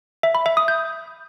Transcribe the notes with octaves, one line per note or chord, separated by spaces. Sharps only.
E5
B5
E5
D#6
G6